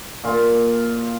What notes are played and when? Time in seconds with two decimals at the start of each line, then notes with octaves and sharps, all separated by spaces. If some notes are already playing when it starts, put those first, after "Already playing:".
0.24 A#2 F4